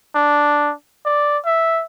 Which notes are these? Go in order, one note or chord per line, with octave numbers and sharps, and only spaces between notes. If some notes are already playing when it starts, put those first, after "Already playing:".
D4
D5
E5